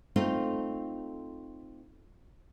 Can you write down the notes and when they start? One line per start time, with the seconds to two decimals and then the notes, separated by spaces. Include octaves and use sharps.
0.16 A3 C4 D#4 F4